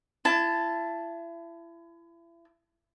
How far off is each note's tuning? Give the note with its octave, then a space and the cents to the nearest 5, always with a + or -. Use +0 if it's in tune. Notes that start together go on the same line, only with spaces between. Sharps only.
E4 +35 A5 +0